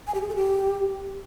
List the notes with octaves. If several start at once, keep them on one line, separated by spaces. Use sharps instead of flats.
G#5
G4
G#4
A4
G4